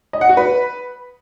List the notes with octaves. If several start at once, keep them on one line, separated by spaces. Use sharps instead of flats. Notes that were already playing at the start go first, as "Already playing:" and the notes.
D#5
F#5
F#4
B4